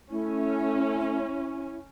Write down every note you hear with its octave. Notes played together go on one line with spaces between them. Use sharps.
A3 C#4 E4